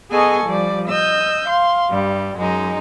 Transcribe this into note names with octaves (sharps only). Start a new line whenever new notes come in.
B3 G#4 A4 D#5 G#5 C#6
F3 G3 D5
D#5 E6 G6
F5 C6
G2 G3
F#2 G#3 D#4